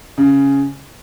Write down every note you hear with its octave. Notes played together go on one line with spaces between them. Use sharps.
C#3